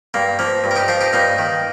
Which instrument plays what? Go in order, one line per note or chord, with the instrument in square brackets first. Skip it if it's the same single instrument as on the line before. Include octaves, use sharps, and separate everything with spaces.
[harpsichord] G2 A#3
F3 A#3
G2
A#4
D#4 G4
F3 F4 A#4
D#4 G4
G2 A#3 D#4
D#3